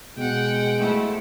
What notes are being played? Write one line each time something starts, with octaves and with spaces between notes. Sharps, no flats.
B2 G#3 F#5 G5
F3 A3 E4